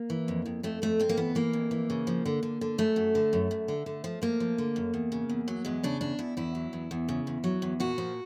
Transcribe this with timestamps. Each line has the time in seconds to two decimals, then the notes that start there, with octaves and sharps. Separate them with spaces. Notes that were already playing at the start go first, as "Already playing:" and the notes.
Already playing: A#3
0.10 E3
0.28 F2
0.46 F2
0.63 F2 A3
0.82 F2 A3
0.99 F2 C4
1.09 A#3
1.17 E3 B3
1.35 E3 A#3
1.53 F2
1.71 E3
1.90 C#3
2.07 F3
2.26 D3
2.43 D3
2.61 D3
2.78 F#2 A3
2.96 F#2
3.15 D3
3.33 F#2
3.51 F#2
3.68 D3
3.86 D3
4.04 F3
4.22 F3 A#3
4.40 F3
4.58 D3
4.76 F#2
4.94 E2
5.12 C#3
5.29 E2
5.48 F#3
5.65 E2 G#3
5.84 C#3 D4
6.01 E2 D4
6.19 E2 E4
6.37 E2 E4
6.55 F#3
6.73 E2
6.91 E2
7.09 C#3
7.27 E2
7.44 F#3
7.62 E2
7.80 A#2 F#4
7.98 F3